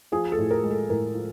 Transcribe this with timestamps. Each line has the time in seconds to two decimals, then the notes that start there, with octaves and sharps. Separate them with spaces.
0.12 F3 G#4
0.32 A4
0.38 A2
0.51 A#4
0.64 G#3
0.71 A4
0.89 A2 A#4
1.15 F3